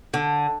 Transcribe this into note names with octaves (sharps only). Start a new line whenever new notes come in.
D3